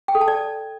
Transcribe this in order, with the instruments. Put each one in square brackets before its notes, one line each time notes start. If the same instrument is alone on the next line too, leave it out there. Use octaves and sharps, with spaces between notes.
[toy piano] G5
A4
A5
D5